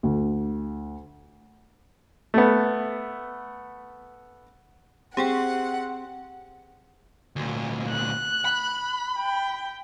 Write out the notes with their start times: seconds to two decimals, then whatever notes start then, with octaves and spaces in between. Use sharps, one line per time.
0.03 D2
2.34 A3 B3
5.17 C4 G4 G#4 F#5 G5
7.36 D2 A#2
7.89 F#6
8.45 B5
9.18 G5